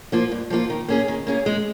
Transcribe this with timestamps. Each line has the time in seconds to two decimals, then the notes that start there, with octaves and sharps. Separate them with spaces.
0.12 F3 A#3 F4
0.31 G2
0.50 F3 A#3 F4
0.70 D#3
0.88 A#3 C#4 G#4
1.08 D#3
1.27 A#3 C#4 G#4
1.46 G#3